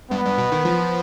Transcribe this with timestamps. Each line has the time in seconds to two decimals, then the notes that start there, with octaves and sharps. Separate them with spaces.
0.11 G2 B3
0.25 G2
0.38 B2
0.52 D#3
0.65 F3